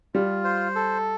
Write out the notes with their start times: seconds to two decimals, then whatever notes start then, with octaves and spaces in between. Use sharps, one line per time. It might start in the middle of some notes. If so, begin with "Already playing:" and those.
0.14 G3 F4
0.44 C5
0.75 A4